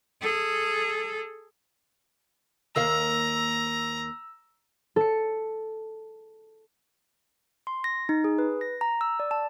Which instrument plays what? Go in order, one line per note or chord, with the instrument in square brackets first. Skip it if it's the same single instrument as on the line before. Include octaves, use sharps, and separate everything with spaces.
[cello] G#4 A4
[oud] D#2 A#3 F5 [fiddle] A#5 [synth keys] E6
[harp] A4 C#7
[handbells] C6
A#6
D#4
G#4
B4
A#6
A#5
E6
D5
A5